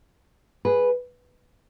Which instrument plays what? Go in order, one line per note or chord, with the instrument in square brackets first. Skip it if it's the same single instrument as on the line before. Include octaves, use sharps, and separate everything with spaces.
[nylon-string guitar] G#4 B4